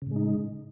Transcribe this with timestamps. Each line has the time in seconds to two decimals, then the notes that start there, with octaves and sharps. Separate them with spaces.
0.02 C#3
0.07 A2
0.11 G#3
0.16 D#4